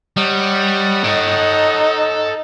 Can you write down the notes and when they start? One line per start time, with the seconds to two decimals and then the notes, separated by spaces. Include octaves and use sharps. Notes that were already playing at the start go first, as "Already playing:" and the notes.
0.17 G3 C#5 D#5 F#5
1.04 D#4 A4 G5